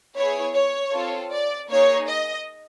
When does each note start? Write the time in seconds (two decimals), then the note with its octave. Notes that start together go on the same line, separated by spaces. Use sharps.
0.16 B3 E4 G#4 C#5
0.55 C#5
0.93 C4 F4 A4
1.32 D5
1.70 A#3 D#4 G#4 C#5
2.08 D#5